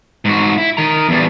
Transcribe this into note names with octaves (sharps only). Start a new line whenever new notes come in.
G#2 F#4
E4
D#3 A#5
E2 G3